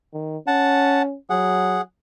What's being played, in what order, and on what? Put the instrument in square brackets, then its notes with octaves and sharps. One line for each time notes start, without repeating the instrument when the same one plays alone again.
[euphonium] D#3
[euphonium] C#4 [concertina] F#5 A5
[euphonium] F#3 [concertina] G#4 F#5